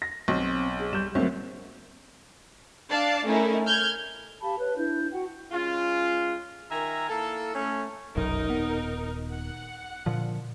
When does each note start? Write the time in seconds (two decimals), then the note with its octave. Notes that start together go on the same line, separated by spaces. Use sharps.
0.02 A#6
0.28 B1 C4
0.79 G#4
0.93 G3 G6 E7
1.15 D2 F#3 A#3 C4 C#5
2.90 D4 D5 F5 A5
3.25 A3 C#4 D#4 E4 A#4
3.66 F6 G6 G#6
4.42 G4 F5 A5 B5
4.59 B4 C#5
4.77 D4 E4 G6
5.13 F#4 F#5 G5
5.52 G#3 C#4 F4
6.71 D#3 A#4 E5 G#5 A#5
7.09 A#3 E4 A4
7.54 A3 C#4
8.16 F1 B1 F#2 D#4 A#4
8.50 D#1 B3
9.31 F#5
10.06 A#2 D3 F3